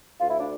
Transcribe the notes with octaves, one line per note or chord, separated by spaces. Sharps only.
D2 F4
E4
D4